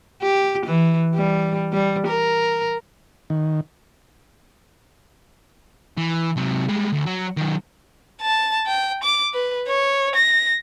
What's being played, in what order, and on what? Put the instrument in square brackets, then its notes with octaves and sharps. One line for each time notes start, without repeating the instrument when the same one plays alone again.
[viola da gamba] G4
E3
G3
G3
A#4
[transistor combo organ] D#3
[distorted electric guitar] E3
C3 F#3
G3 G#3
D2
F#3
D#3 F#3
[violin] A5
G5
D6
B4
C#5
A#6